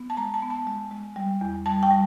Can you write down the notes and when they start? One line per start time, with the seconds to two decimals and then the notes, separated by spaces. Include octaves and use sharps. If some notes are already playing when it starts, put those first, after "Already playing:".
Already playing: B3
0.10 A5
0.17 G#3 A#5
0.34 A5
0.43 B3
0.50 A5
0.67 G#3
0.91 G#3
1.16 G3
1.41 E2
1.66 G3 A5
1.83 G5
1.91 G3